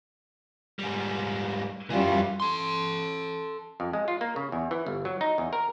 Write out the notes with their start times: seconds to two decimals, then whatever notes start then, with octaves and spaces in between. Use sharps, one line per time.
0.79 G#2 G3
1.90 F#2 E3 G3 F4
2.40 A4 C6
3.80 F2
3.93 G#3
4.08 F4
4.21 A#3
4.36 C#3
4.52 E2
4.71 E3
4.87 G1
5.05 F#3
5.21 D#4
5.38 E2
5.53 A#4